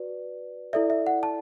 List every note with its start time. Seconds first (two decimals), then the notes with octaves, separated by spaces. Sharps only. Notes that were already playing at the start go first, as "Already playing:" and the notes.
Already playing: F#4 B4 D5
0.73 E4 A4 D5 E5
0.90 E5
1.07 F#5
1.23 A5